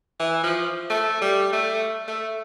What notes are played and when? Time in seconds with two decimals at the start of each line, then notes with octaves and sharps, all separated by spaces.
0.20 E3
0.43 F3
0.90 A3
1.21 G3
1.53 A3
2.08 A3